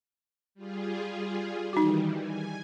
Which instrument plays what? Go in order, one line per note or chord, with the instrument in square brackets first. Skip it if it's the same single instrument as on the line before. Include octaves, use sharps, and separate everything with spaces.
[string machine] G3 F4 G#4
[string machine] D#3 E3 G3 [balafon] D#4 F#4
[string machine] G#5